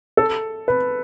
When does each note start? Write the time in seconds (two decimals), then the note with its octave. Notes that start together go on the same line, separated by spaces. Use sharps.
0.17 A4
0.68 B4